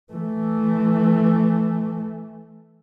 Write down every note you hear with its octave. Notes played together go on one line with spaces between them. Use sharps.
E3 A3